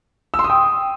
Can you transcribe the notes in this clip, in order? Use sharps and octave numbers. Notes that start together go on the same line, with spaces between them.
E6
C6
D#6
G5